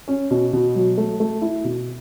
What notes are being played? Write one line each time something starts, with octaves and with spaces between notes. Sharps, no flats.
C#4
B2
B2
F#3
A3
A3
E4
B2